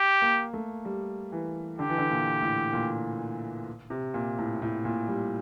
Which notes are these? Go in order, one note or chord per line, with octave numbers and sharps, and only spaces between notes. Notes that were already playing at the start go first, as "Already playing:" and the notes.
Already playing: G4
A#3
A3
G3
E3
D3 G4
E3
D3
A#2
A2
A#2
C3
A#2
A2
A2
A#2
G3